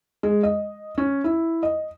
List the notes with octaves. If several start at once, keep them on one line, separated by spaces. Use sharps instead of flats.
G#3
D#5
C#4
E4
D#5